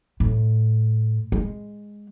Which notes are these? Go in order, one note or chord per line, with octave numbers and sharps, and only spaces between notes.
A2
G#3